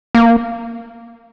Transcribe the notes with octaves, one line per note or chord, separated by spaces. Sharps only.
A#3